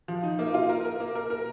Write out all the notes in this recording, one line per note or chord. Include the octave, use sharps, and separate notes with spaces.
F3
D#4
A#3
F4
A#4
A#4
A#3
A#4
A#4